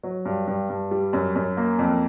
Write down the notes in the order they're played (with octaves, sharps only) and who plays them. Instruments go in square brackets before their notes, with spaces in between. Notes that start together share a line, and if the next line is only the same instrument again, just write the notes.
[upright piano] F#3
G2
G2
G2
G3
F#2
F#2
A#3
F2